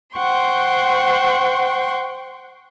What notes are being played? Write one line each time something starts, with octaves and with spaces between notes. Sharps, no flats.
C5 F#5 G5 C6 C#6